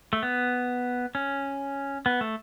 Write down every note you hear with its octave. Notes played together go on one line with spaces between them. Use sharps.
A3
B3
C#4
B3
A3